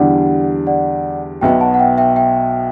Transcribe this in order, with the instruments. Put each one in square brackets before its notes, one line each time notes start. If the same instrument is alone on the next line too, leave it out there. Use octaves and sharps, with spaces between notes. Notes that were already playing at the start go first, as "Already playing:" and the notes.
Already playing: [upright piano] E2 D3 G3 D4 G4 [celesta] D5 F#5
[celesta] D5 F#5
[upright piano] B1 B2 F#3 B3 [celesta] E5 G5
[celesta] F#5 A5
F#5
E5 G5
E5 G5
E5 G5